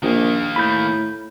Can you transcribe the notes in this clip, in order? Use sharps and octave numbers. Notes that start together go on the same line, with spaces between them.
A#1 D#3 A#3
A2 B5 G6